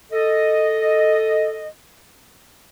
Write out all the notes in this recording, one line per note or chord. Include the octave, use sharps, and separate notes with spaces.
A4 D#5